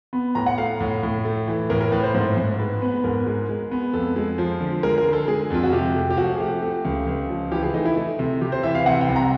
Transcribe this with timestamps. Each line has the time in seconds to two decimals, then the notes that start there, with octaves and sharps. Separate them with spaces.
0.13 B3
0.35 A2 A#5
0.46 F#5
0.58 A3 F5
0.80 A2
1.03 A2
1.25 A3
1.48 E3
1.70 A2 A#4
1.81 A#4
1.92 A2 B4
2.03 C5
2.14 G#2 C5
2.37 G#2
2.59 G#3 B4
2.82 B3
3.04 G#2 A#4
3.26 G#3
3.49 G#3
3.71 B3
3.93 F2 A4
4.16 G#3
4.38 F3
4.61 D3
4.83 G#3 A#4
4.98 A#4
5.06 D3
5.13 A4
5.28 G#3 G#4
5.50 F2 F4
5.63 F#4
5.73 C3 G4
5.95 A3
6.10 G4
6.17 F3 F#4
6.35 G#4
6.40 A3 G4
6.62 A3
6.85 C#2
7.07 C#2
7.29 F3
7.52 E3 G4
7.62 G#4
7.74 A3 D#4
7.85 E4
7.96 A3
8.19 C3
8.41 C3 G4
8.52 C5
8.63 E3 E5
8.75 F5
8.86 C3 F#5
9.01 G5
9.09 C2
9.16 A#5